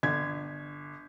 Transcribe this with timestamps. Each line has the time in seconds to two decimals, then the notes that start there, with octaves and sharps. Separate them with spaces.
0.03 G1 G#6